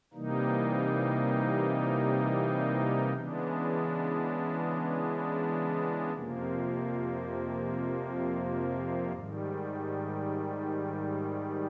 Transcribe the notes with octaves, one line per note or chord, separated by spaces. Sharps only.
C3 E3 G3 A#3 D#4
C#3 E3 G#3 B3 D4
F2 C3 F3 A#3
G#2 D#3 G3